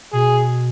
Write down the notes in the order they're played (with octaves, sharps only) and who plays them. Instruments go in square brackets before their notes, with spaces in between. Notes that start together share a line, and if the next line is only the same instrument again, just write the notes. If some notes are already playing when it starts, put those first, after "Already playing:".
[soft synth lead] B2 [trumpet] G#4